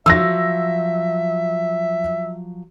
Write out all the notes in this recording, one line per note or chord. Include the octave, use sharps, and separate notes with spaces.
F3 F#3 E5 E6 A#6